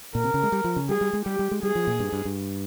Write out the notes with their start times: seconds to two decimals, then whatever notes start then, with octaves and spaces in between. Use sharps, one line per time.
0.15 A#2 A#4
0.24 C3
0.34 C#3
0.43 G#3
0.52 G3
0.64 F3
0.76 C#3
0.89 G3 G#4
1.01 G3
1.13 G#3
1.26 G3 G4
1.39 G3
1.51 G#3
1.63 G3 G#4
1.75 F3
1.87 A#2
2.00 G2
2.13 G2
2.25 G2